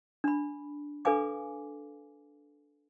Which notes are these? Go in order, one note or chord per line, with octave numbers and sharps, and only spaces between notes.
D4 B5
D4 A4 B4 F5 G#5 D6